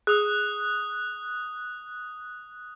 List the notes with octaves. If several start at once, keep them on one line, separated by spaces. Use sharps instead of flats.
G#4 D#6 F#6